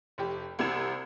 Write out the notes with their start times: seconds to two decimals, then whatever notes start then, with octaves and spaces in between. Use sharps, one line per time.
0.18 F1 G4
0.59 C2 C3 G#6 E7